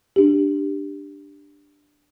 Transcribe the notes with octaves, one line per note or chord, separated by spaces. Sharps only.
D4 G4